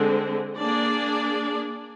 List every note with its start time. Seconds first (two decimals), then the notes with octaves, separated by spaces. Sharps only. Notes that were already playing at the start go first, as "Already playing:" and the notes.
Already playing: D3 G#3 C4
0.57 A#3 D4 G#4 D5